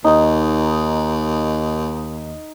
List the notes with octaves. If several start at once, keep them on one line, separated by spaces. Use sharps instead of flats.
D#2 D#4